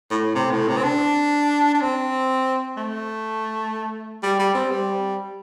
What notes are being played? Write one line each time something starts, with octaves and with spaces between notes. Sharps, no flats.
A2
C3
A2
C3
C4
D4
D4
C4
A3
G3
G3
C4
G3